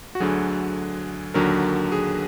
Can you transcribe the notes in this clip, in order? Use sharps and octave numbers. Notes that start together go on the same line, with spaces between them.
F#4
D2 D3 F#3 G#4
D#2 D3 F#3 A#4
G#4